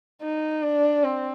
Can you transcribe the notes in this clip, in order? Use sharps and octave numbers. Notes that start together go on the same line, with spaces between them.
D#4
D4
C4